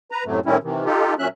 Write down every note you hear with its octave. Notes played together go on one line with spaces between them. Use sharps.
B4 A#5
F#2 A2 C3 F#3 A3
A2 D#3 G3 C4 C#4 E4
C3 D#3 E3
D#4 F4 G4 A4
A#2 F#3 C#4 E5 F#6